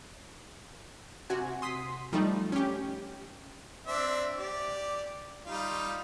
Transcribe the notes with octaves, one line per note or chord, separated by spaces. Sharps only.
C3 F#4 G#5
C6 D#6 B6
F3 G3 A3 D#4
C#4 G4
C4 D4 E5
G4 D5
G3 D#4 F4